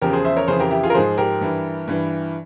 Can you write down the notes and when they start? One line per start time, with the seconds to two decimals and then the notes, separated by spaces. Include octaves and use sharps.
0.01 E2 C#3 F3 G4 A#4
0.13 G#4 C5
0.25 C5 E5
0.37 A#4 C#5
0.48 F2 C#3 E3 G#4 C5
0.60 G4 A#4
0.71 E4 G4
0.83 F4 G#4
0.90 A#4
0.94 G#2 F3 G#4 C5
1.18 G4 A#4
1.41 G2 E3
1.87 G2 E3